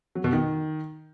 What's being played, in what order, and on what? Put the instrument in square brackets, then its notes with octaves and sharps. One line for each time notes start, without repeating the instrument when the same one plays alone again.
[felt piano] F#3
B2
D#3